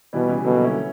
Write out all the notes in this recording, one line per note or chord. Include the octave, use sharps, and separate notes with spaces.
B2 E3 G3
C#3 E3
B2 D3 F#3
F#3 A#3
C#4 E4